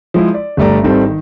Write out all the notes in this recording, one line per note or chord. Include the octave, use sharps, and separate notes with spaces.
F3 G#3 E4
D5
G1 G3 A3 D5 A#5
G#1 D#3 G3 C4 A4
D#3